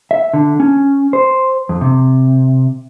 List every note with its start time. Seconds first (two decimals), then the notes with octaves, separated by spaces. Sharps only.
0.11 E5
0.34 D3
0.60 C#4
1.13 C5
1.69 F2
1.81 C3